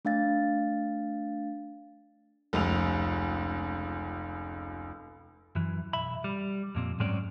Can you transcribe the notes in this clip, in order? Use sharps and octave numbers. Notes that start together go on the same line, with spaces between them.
A3 D4 F5 A6
F1 C#2 F7
F#2 E3
B1 E5 B5
G3
F2 A#2 C4
G#2 F#3 G#3 C4 C#4 D5